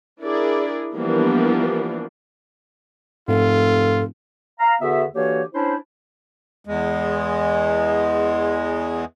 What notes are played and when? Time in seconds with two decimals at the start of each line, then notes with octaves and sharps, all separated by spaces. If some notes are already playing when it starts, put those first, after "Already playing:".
0.22 D4 E4 G#4 A#4 D5
0.95 E3 F3 G3 A#3 B3 D4
3.28 F1 G#2 F4 A4
4.59 F5 A#5
4.81 E2 D3 B3 F#4 E5
5.14 D3 E3 A#3 F#4 G4 C#5
5.53 C#4 D4 E4 C5
6.65 E2 G#3